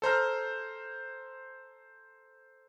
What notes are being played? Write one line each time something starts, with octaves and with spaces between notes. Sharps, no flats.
A4 C5 A#5 F6